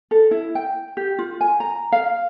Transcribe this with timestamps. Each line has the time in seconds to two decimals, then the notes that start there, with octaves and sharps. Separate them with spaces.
0.11 A4
0.31 E4
0.55 G5
0.97 G4
1.19 F4
1.41 G#5
1.60 A#5
1.92 F5